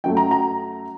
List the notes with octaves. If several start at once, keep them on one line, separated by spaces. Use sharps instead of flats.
F#2 F#3 A3 G5
A#5
A#5